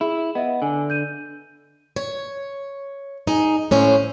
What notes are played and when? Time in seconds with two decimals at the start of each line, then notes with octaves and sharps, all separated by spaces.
0.01 E4 G#4
0.35 B3 D#5 E5
0.62 D3 G#5
0.90 G6 D#7
1.96 C#5
3.27 D#4 G#4
3.71 A2 C#4 C5